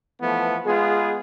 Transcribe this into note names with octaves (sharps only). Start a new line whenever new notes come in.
E3 F3 A3 B3
G#3 B3 F4 G#4